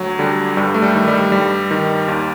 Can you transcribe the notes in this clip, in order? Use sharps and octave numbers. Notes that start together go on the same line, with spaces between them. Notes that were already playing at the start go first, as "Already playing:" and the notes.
Already playing: D2 F#3
D3 G3
G2 G3
A3
G3
D#3
G3
G2 G3
D#3
D#2